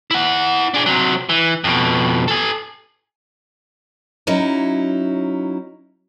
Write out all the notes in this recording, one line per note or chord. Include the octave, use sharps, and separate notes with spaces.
E4 F#5
D4 G#4
C3 F#3
E3
F2 B2
A4 G#5
F#3 C#4 D#4 E4